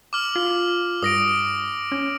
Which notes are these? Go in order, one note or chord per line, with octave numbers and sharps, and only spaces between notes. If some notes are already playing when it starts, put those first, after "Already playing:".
D6 F6 F#7
F4
G2 D#6 A#6 D7
C#4